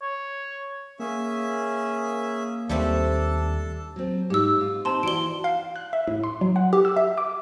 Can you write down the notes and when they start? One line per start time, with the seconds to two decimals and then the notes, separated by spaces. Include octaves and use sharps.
0.02 C#5
1.00 A#3 C#4 G#4 E5
2.69 D#2 G3 A3 C4 D4 A4 A5
3.96 F#3 C4
4.30 G#2 G4 E6
4.61 F4
4.85 C4 D4 D#4 A5 A#5 C6
5.03 E3 F#4 D5 D7 G7
5.44 F5
5.76 F#6
5.93 E5
6.07 A2
6.24 C6
6.41 F#3
6.56 F#5
6.73 G4
6.85 E6
6.97 E5
7.18 D6